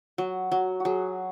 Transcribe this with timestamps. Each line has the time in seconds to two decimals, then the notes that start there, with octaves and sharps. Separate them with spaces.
0.18 F#3 F#4
0.52 F#3 F#4
0.80 F#3 F#4 G#4